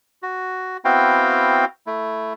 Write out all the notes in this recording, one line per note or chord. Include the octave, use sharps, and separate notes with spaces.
F#4
B3 C4 E4 F#4 F5 G5
A3 E4